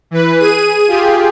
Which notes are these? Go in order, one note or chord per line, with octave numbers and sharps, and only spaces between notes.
E3 B4
G#4 D#7
F4 G4 G#4